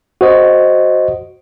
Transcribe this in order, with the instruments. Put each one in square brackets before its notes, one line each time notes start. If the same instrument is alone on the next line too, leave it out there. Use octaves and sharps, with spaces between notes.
[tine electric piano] F#4 C5 D#5